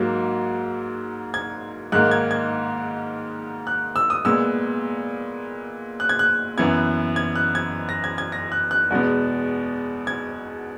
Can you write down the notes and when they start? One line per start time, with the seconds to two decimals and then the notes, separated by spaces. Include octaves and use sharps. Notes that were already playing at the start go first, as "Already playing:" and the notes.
Already playing: G#2 F#3 A#3
1.34 G#6
1.92 G#2 D#3 A#3 F#6
2.11 G#6
2.31 G#6
3.67 F#6
3.96 E6
4.10 D#6
4.25 A#2 G#3 B3 E6
6.00 F#6
6.09 G#6
6.19 F#6
6.58 F#2 E3 B3 G#6
7.16 G#6
7.36 F#6
7.55 G#6
7.89 A#6
8.04 G#6
8.18 G#6
8.32 A#6
8.52 F#6
8.71 F#6
8.91 E2 B2 G#3 B3
10.07 G#6